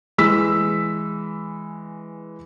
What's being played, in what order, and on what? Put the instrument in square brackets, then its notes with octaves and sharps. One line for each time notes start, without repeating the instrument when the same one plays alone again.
[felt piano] E3 G#3 E6 B6